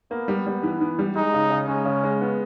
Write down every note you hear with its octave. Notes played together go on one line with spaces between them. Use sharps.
A#3 B3
G3
G3
E3
E3
G3
G#3 D#4
C#3
C#3
G#3 C#4
C#3
G#3
B3